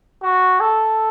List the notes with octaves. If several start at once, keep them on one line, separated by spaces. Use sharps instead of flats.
F#4
A4